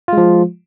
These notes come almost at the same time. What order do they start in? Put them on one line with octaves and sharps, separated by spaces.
F4 G#3 F3